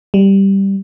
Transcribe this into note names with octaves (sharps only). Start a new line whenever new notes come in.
G3